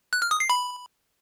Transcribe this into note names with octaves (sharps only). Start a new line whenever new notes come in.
F#6
F6
D#6
C7
B5